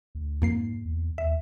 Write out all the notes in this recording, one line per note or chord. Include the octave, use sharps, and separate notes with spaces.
D2
F2 G#2 A#3 C7
E2
D#2 E5